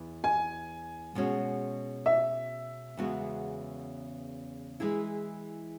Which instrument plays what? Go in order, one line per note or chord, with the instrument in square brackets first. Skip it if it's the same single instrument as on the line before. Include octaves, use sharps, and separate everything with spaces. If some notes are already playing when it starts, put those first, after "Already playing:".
Already playing: [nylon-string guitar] E2 E3 E4
[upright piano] G#5
[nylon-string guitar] B2 G#3 C#4 F#4
[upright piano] E5
[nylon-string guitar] E2 C#3 G#3 B3 F#4
E3 G#3 E4 G#4